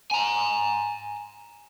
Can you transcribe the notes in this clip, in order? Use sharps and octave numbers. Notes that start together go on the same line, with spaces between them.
G#5 A#5